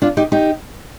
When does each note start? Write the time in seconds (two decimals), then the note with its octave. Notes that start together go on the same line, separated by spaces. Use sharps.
0.02 D4 F4
0.17 D#4 G4
0.32 D#4 G4